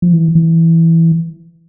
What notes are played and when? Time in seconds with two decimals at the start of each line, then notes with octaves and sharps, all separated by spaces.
0.02 F3
0.13 E3
0.35 E3